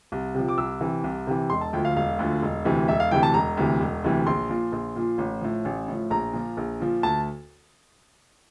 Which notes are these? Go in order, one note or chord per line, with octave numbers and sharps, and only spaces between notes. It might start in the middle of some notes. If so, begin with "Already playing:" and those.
C2
C3 F3
D6
C2 E6
C3 E3
C2
C3 E3
E1 C6
A5
D2 D3 F3 G5
F5
E1 F5
D2 D3 F3
E1
D2 C3 E3
E1 E5
F5
D2 C3 E3 G5
A5
E1 A#5
D2 C3 E3
E1
D2 C3 E3
A#1 C6
A#2 F3
A#1
A#2 F3
A1
A2 F3
A1
A2 F3
A#1 A#5
A#2 F3
A#1
A#2 F3
D2 A5